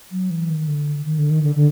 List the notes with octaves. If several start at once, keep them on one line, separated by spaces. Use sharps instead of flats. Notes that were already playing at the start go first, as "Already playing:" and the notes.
F#3
E3
D#3
D3
D#3
D3
D#3
D3
D3